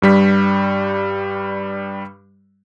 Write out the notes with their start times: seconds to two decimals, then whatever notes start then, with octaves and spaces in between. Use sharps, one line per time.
0.02 G2 G3 B6